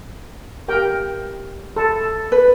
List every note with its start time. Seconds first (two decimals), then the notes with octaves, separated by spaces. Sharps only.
0.68 G4 A#4 G5
1.76 A4
2.32 B4